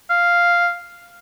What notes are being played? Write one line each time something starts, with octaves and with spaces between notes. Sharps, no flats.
F5